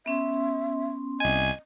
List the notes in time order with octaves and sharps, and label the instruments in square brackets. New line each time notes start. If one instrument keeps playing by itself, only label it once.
[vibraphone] B3 C#4 C6 [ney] E5
[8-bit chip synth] C2 G#5 [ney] D#5